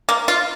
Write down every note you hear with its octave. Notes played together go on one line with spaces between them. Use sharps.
A#3
F4